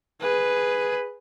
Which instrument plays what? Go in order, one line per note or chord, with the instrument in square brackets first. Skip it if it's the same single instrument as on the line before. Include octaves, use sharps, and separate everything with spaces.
[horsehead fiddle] G#4 B4